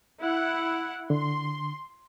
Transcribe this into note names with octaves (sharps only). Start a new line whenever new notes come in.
E4 F#5
D3 C6